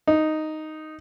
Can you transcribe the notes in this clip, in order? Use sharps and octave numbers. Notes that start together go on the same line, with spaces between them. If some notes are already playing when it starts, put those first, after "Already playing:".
D#4